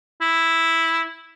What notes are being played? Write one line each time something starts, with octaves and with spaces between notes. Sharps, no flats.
E4